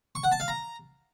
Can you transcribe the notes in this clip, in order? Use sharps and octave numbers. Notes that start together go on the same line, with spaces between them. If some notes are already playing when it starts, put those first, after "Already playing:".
C#6
F#5
A5
F5
A#5